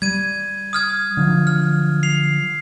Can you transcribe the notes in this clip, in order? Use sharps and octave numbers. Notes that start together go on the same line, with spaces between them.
G3 G#6 D#7
D#6 F6 G#6
D3 F3 F#3
F6
C7 F7